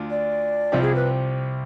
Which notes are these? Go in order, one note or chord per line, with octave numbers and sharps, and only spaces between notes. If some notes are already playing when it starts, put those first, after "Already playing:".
Already playing: D2 D4 F4
D5
C2 C3 F3 C4 G4
G#4
B4